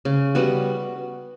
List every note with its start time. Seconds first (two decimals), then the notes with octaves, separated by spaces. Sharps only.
0.05 C#3
0.35 G3 B3 F#4